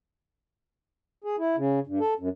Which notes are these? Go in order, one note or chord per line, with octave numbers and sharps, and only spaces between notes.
G#4
E4
C#3
G2
A4
F#2